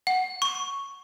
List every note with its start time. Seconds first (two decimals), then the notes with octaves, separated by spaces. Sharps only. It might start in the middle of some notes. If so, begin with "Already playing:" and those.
0.07 F#5
0.42 C#6